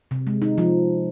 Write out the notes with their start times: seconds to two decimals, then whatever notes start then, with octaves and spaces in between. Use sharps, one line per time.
0.11 C3
0.27 G#3
0.42 D#4
0.58 F3